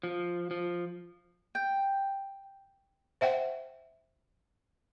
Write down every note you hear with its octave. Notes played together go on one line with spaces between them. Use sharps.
F3
F3
G5
C5 E5 F#5 G5